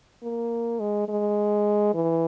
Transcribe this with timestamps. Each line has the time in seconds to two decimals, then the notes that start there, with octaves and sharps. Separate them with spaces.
0.23 A#3
0.80 G#3
1.09 G#3
1.94 E3